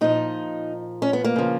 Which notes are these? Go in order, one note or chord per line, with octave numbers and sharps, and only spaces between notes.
A#2 F3 D#4
C#4
B3
A#3
C#3 F3